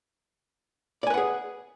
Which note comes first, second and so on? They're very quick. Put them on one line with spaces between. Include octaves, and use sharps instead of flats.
D5 G#5 B4 F#5 G#4